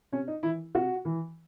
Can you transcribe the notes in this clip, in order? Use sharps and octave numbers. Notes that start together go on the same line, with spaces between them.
C3 C#4
D#4
E3 E4
C3 F#4
E3